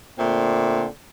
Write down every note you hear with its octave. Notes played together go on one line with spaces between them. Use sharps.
A#2 D3 A3 C4